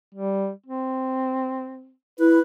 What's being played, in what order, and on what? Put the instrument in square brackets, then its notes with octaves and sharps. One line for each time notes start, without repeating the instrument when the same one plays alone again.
[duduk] G3
C4
[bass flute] E4 [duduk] B4